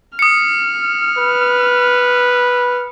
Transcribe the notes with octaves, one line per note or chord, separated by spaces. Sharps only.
D#6 F6 C#7
B4